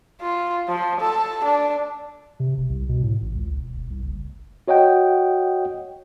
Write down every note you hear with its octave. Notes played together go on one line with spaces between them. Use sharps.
F4
F3
A4
D4
C3
E1
C2
B2
A2
A1
C#2
E1
E1
C2
F#1
F#4 C#5 D#5 F#5 G5